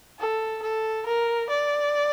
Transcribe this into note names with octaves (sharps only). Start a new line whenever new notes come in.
A4
A4
A#4
D5